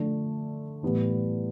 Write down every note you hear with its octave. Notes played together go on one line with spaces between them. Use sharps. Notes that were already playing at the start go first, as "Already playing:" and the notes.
Already playing: D3 F3 A3
A2 E3 G3 B3